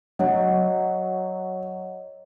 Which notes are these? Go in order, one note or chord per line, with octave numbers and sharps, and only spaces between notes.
F#3 C#5 D#5 F#5